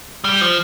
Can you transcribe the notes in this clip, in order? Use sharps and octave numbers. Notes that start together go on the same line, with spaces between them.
G3
F3